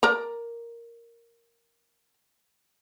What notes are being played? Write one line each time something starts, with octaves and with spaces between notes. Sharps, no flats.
A#4 D5 A#5